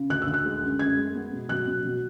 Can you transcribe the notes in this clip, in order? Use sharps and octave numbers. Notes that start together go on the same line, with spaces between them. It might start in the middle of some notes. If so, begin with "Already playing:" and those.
Already playing: C#3
D2 F#6
E6
D2
F#6
G#3
F#2
F#2 G#6
G#3
B3
B2
F#3 F#6
B2
F#3